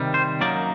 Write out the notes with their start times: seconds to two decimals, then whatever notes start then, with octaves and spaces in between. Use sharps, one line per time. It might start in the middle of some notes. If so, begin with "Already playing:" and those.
Already playing: C3 D#3 G3
0.14 C5
0.41 F#2 F#3 A#3 D#4 D5